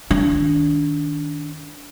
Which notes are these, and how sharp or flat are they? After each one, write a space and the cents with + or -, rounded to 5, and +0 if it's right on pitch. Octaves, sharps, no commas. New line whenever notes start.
D#3 +0 D4 -20